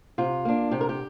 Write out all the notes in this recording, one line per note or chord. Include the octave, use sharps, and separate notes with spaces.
C3 F4
A#3 D4
C3 G4
A#4
G4